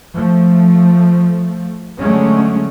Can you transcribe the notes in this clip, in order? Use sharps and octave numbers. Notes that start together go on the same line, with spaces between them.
F3 A3
D3 F#3 G#3 A3 C#4